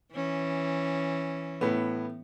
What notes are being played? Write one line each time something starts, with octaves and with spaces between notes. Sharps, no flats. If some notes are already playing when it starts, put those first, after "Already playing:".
E3 C#4
A2 B3